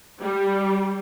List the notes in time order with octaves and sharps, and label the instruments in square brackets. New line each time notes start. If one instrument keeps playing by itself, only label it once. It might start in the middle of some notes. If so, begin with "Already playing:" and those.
[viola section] G3